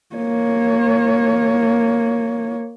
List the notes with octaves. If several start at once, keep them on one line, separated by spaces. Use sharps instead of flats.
A#3 C#5